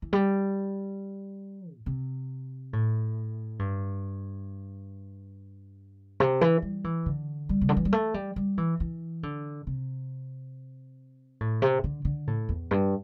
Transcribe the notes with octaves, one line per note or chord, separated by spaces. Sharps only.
E3
G3
A2
C3
A2
G2
C3
E3
G3
E3
D3
G3
C3
D3
E3
G3
A3
G3
G3
E3
E3
D3
C3
A2
C3
D3
D3
A2
E2
G2